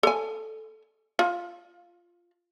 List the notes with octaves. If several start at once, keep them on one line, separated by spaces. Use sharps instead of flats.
A4 G#5
F4